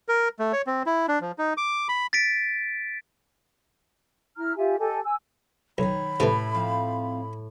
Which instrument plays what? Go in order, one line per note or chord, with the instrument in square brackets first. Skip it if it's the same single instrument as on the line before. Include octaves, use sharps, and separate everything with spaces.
[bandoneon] A#4
A3
C#5
C4
E4
D4
F3
D#4
D6
B5
[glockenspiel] A6 B6 D7
[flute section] E4 A#5 F6
F4 G4 E5 G#5
G4 A4 D#5 G#5
G#5 E6
[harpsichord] B1 [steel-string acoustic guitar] D#3 D#4 C#5 [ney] B5
[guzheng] A2 [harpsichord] C3 E3
[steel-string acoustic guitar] F3 C4 F5